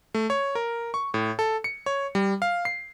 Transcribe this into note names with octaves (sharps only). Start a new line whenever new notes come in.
A3
C#5
A#4
C#6
A2
A4
C#7
C#5
G3
F5
C7